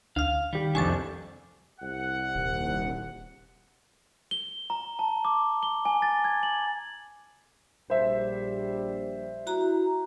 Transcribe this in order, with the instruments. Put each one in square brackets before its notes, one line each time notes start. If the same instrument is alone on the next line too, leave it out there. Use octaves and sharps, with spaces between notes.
[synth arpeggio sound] D2 F6 [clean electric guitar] F5
[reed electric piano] D#3 G4 [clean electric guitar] G3
[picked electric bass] C2 F2 [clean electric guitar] D4 [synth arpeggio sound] G#5 C#6 A6
[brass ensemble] C2 F#5
[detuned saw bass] D#1
[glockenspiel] G7
A#5
A5
D6
G7
G#5
A6
G#6
F#7
[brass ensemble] A#1 G3 [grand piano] C5 E5
[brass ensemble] E4 [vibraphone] F#4 A#5